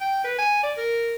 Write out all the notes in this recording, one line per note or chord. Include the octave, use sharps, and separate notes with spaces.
G5
B4
G#5
D5
A#4